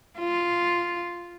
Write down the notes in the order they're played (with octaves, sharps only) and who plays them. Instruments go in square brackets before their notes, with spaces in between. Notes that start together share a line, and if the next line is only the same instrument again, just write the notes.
[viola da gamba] F4